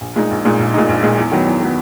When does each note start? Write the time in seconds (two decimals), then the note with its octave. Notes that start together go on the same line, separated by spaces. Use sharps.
0.01 A#1
0.16 A#2 G#3 D#4
0.31 A#1
0.45 A#2 G#3 D#4
0.59 A#1
0.74 A#2 G#3 D#4
0.89 A#1
1.03 A#2 G#3 D#4
1.18 E2
1.32 D#3 F#3 B3
1.46 E2
1.60 D#3 F#3 B3